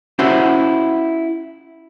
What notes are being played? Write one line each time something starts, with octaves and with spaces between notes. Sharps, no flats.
C#4 E4 F#4 C5 E5